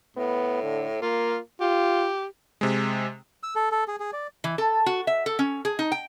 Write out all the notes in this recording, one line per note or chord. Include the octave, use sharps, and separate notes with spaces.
A2 B3
D3
A#3 F4
F4 G4
C3 G#3
E6
A4
A4
G#4
G#4
D5
E3
A4
F#4
E5
A4
C#4
G#4
D#4
G5